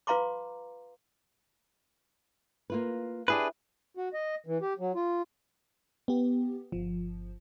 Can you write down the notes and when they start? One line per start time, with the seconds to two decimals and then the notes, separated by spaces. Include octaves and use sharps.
0.07 F4 B4 F5 A#5 C6 D6
2.70 A#3 F4 B4
3.28 D4 E4 G4 G#4 B4
3.97 F#4
4.14 D#5
4.47 E3
4.61 G4
4.79 F#3
4.95 F4
6.08 B3 G4
6.72 G1 F3